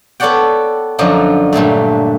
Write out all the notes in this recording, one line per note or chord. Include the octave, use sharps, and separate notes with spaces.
B3 A4 C#5 D5 F#5 G5
F#2 D3 F3 F#3 D#4
G2 A#2 F#3 A3